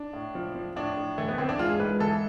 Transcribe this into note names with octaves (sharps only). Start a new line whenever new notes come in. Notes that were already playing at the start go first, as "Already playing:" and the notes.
Already playing: D4
A2
F3
F3
A2 D4
A2
E3 A3
B3
E3 C4
D4
G#2 F4
G#4
G#2 B4
E3 A4